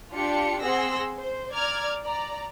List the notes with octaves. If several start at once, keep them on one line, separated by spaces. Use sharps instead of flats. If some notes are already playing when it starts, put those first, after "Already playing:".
D4 F4 G4 C#7
C4 G#4 F#5 C6 E6 A#6
C5
D5 A#5 D6 F6 G#6
D5 A#5